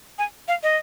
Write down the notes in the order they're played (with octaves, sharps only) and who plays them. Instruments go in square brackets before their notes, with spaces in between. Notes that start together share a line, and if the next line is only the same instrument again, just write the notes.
[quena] G#5
F5
D#5